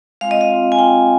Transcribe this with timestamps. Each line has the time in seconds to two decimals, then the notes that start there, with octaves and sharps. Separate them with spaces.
0.21 G#3 C4 F4 F5
0.31 D#5
0.41 F5
0.50 G#3 C4 F4
0.72 G#5
0.78 G#3 C4 F4 G5